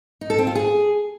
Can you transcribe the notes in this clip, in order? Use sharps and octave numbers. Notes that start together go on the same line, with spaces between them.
D#4
A4
C4
F4
G#4